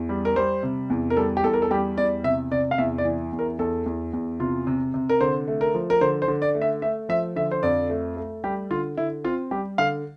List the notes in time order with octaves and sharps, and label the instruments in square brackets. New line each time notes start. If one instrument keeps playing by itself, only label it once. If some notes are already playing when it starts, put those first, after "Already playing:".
Already playing: [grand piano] E2
G3
A#4
G3 C5
C3
E2
A#4
G3 A4
G4
E2 A4
A#4
A4
G3 G4
E2 D5
C3 E5
C3 D5
F5
E2 E5
D5
E3
E2
A#4
E2 A4
E2
E2
C3 F4
C3
C3
A#4
D3 C5
A3
A#4
F3
A#4
D3 C5
C5
D3
D5
A3
E5
A3 E5
F3 E5
D3 E5
C5
F2 D5
A3
A3
G3 G4
D3 F4
D3 E4
C4 F4
G3 G4
D3 F5